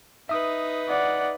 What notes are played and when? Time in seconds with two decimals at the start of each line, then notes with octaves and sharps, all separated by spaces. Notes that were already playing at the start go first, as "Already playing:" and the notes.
0.29 D#4 B4 E5 D#6
0.89 D5 F#5